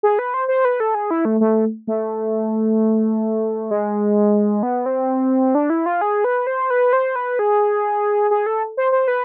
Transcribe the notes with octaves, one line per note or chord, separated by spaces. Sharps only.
G#4
B4
C5
C5
B4
A4
G#4
E4
A3
A3
A3
G#3
B3
C4
D4
E4
F4
G#4
B4
C5
B4
C5
B4
G#4
G#4
A4
C5
C5
B4